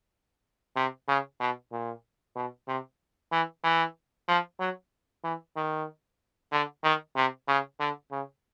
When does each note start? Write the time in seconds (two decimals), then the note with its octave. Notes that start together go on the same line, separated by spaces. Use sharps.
0.76 C3
1.08 C#3
1.40 B2
1.72 A#2
2.36 B2
2.68 C3
3.32 E3
3.64 E3
4.28 F3
4.60 F#3
5.24 E3
5.56 D#3
6.52 D3
6.84 D#3
7.16 C3
7.48 C#3
7.80 D3
8.12 C#3